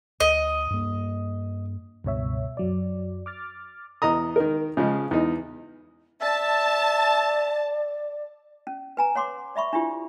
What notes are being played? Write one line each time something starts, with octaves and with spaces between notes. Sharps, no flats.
D2 D#5
G2 A#3
C#2 G2 B2 C#5 E5
F#2 F#3 D5
D6 F6 A6
E2 D#5 A#5 D#6
D#3 A#4
C#3 F3 G#3
E2 D#4
D5 E5 A5
C#4
B4 G#5 A#5
C#5 F#5 C6 D6
D5 E5 B5 C#6
D4 E4 F4 G4 C5